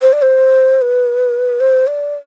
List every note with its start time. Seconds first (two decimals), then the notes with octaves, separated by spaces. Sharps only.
0.02 C5
0.13 D5
0.22 C5
0.81 B4
1.60 C5
1.87 D5